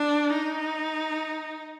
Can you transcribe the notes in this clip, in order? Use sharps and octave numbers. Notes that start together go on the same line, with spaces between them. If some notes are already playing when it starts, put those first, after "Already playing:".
Already playing: D4
D#4